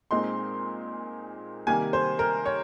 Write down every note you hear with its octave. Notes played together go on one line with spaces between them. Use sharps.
A#2 G#3 C4 D#4 C6
C3 D#3 G3 A#3 G#5
C5
A#4
C#5